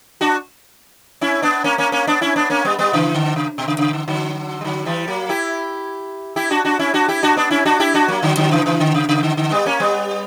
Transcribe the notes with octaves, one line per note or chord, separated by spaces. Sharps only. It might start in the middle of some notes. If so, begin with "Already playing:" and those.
D4 F#4
C#4 E4
B3 D4
A#3 C#4
A#3 C#4
A#3 C#4
B3 D4
C#4 E4
B3 D4
A#3 C#4
G3 B3
G3 B3
C#3 E3
D3
C#3
B2
C#3
C#3
D3
D3 F#3
G3
D3 F#3
E3 G3
F#3 A#3
E4 G4
E4 G4
D4 F#4
D4 F#4
C#4 E4
D4 F#4
E4 G4
D4 F#4
B3 D4
C#4 E4
D4 F#4
E4 G4
D4 F#4
F#3 A#3
D3 F#3
D3 F#3
C#3 E3
C#3 E3
D3
C#3
C#3
D3
D3
G3 B3
A#3 C#4
G3 B3